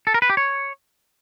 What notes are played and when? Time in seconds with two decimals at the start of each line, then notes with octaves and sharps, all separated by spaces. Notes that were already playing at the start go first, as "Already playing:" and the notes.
0.07 A4
0.14 A#4
0.22 B4
0.30 G4
0.37 C#5